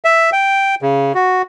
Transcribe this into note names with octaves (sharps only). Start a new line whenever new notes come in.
E5
G5
C#3
F#4